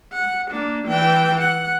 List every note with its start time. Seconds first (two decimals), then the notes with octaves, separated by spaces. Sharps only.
0.13 F#5
0.51 A#3 D4
0.88 E3 G5
1.41 F#5